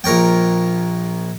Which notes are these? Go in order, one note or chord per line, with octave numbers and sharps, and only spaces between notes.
A#1 A#4 C#5 G5